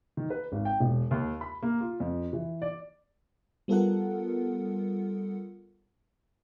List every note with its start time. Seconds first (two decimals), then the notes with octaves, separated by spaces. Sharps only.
0.17 D#3
0.30 B4
0.52 G#1
0.65 G5
0.80 E1
1.11 D#2
1.41 B5
1.63 A#3
1.81 F4
2.00 F2
2.33 E3
2.62 D5
3.68 G3 B3 F4 A4 A#4 F#5